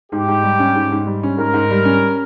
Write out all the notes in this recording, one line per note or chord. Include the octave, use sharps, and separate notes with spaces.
G#2 G4
G#2
G3
C#4
G#2
G#2
G3
C#4
G#2 A#4
G#2
G3
C#4